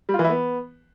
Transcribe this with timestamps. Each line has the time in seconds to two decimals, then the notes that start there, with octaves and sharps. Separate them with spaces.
0.09 G3
0.14 F4
0.19 E3
0.24 E4
0.29 B3